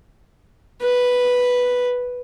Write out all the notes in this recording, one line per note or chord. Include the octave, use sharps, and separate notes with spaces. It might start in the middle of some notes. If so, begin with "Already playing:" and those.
B4